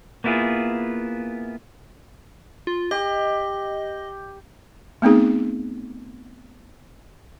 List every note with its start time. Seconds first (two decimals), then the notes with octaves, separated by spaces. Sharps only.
0.24 A#3 B3 E4 F4 G#4
2.67 F4
2.91 G4 D#5
5.02 A3 B3 C4 D#4 G#4